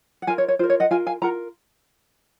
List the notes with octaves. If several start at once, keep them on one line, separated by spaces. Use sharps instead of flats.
F#5
F4 A#4 F5 G#5
C#5
C#5
F4 A#4 C5
C#5
D#5 F#5
F4 A#4 F5 G#5
F5 G#5
F4 A#4 F#5 A#5